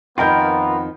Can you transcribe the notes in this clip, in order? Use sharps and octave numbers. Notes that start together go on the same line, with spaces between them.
F2 D#3 B3 F4 A#4 G5 B5 G6